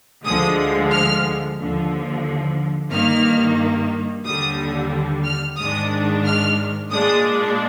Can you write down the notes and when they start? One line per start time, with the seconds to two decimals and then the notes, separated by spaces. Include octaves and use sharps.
0.25 D2 D3 F3 G#3 D#6
0.91 F6
1.58 D#2 D3 F3
2.91 G2 D#3 A#3 F6
4.25 D#2 D3 G3 D#6
5.25 F6
5.57 G#2 D#3 G#3 D4 D#6
6.25 F6
6.91 A#2 G#3 D4 D#6